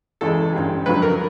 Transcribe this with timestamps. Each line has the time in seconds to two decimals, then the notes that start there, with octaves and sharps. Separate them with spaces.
0.21 E2 C#3 E3 G#3 A4
0.53 A1 G2 D3 G3
0.86 F2 D3 F#3 B4
1.02 A#4